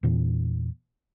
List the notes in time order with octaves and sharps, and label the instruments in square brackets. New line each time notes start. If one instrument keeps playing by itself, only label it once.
[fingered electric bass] E2 A#2 E3